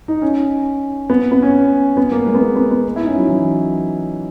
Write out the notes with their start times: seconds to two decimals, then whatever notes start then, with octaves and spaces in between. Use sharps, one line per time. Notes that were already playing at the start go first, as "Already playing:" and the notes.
0.08 D#4
0.22 C#4
1.10 B3
1.32 B3
1.42 C#4
1.97 B3
2.11 A#3
2.27 G#3
2.34 B3
2.42 A#3
2.56 B3
2.71 B3
2.96 E4
3.03 D#4
3.07 C#4
3.18 F#3
3.29 E3